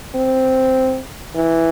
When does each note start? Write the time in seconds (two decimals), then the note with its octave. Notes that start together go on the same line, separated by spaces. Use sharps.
0.15 C4
1.36 E3